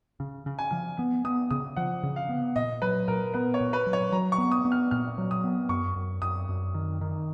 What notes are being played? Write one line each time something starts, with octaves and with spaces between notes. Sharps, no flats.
C#3
C#3
G#5
F3
B3
B3 D#6
C#3 D#6
F3 F#5
C#3
F5
B3
A#2 D#5
F#3 B4
A#2 A#4
B3 B4
C#5
A#2
B4
F#3
C#5
F#3 A#5
C#6
B3
D#6
B3
F6
A#2 F6
F#3
D#6
B3
F#2 C#6
F#2
F#2 D#6
F#2
D#3
D#3